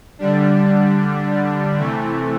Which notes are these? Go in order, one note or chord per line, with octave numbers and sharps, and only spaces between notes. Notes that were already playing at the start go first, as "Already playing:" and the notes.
D3 G3 D4
C3 E3 A3